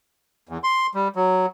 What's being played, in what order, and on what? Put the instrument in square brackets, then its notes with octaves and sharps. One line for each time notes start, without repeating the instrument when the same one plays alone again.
[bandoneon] E2
C6
G3
F#3